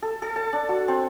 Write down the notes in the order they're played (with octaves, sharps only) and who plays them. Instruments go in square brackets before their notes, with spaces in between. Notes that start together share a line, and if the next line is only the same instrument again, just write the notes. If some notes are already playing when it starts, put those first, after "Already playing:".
[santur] A4
A4
A5
D4
F#4
C4